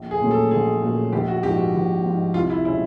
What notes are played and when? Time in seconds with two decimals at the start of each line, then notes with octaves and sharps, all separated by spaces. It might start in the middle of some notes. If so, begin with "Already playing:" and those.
Already playing: A#1
0.11 G#4
0.21 A#2 F#3 A3 C#4
0.31 A4
0.51 A#1 G#4
0.82 A#2 F#3 A3 C#4
1.13 A#1 G4
1.28 F#4
1.43 G#2 F3 G4
1.58 F#4
1.73 A#1
2.04 G#2 F3
2.34 C2 F4
2.50 E4
2.65 B2 G#3 C#4 E4